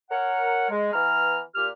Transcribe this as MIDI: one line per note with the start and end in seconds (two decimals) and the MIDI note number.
0.11 0.67 70
0.11 0.67 73
0.11 0.67 78
0.70 0.93 56
0.93 1.39 52
0.93 1.39 59
0.93 1.39 82
0.93 1.39 89
1.55 1.68 46
1.55 1.68 67
1.55 1.68 89